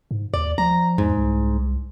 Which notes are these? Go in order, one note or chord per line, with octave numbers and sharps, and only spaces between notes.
G#2
D#2 D5
F3 A#5
E2 G#2
C2